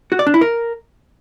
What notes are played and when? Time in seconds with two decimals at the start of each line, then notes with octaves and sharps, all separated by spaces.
0.12 F#4
0.19 D5
0.27 D4
0.34 E4
0.41 A#4